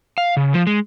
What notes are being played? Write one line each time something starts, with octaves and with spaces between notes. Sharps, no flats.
F5
C#3
F3
G#3